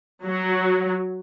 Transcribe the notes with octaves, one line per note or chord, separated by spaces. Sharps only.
F#3